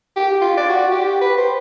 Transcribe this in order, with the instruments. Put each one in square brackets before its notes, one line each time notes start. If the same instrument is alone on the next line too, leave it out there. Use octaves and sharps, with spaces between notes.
[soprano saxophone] G4
F4
D5
F#4
G4
B4
C5